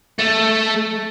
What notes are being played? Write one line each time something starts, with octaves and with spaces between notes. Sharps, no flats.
A3